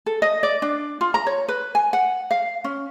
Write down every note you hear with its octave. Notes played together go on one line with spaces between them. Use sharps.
A4
D#5
D5
D4
F4
A#5
C#5
B4
G#5
F#5
F5
C#4